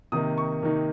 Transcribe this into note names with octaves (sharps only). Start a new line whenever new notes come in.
C3 D#3 A#3 D#4 D#6
C#6
C3 D#3 A#3 D#4